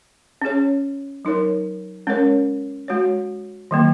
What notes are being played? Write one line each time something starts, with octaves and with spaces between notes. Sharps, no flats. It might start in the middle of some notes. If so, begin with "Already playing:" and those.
C#4 G#4 C#5
F#3 D#4 A#4 C#5
G#3 C#4 A#4 C#5
G#3 F#4 C#5
D#3 F#3 A#3